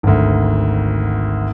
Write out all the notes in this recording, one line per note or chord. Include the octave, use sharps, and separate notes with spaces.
G#1 D2